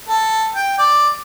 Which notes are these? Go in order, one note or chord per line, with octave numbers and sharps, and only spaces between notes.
A4
G5
D5